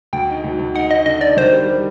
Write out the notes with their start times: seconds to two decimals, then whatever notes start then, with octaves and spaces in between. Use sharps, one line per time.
0.13 D2 G5
0.29 D#4
0.44 D2
0.59 D2
0.75 D#4 F#5
0.90 D#4 D#5
1.06 D3 D#5
1.21 D#4 D5
1.37 D#3 C5
1.52 G3
1.68 G3